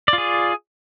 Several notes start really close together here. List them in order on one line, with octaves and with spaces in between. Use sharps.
D5 F4 G#4